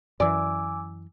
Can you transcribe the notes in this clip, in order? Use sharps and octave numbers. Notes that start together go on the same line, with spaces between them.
F#2 E3 D5 G#5 D6 E6